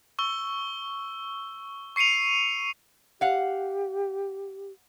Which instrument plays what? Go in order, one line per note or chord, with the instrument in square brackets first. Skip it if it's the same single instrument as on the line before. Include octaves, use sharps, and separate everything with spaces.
[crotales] C#6 E6 G7
C#6 C7 C#7 D#7 F7
[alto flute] G4 [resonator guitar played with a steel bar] F5 F#5